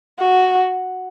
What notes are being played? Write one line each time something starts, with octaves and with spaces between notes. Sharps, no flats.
F#4